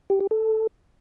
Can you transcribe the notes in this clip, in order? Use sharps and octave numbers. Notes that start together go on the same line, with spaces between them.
G4
G4
A4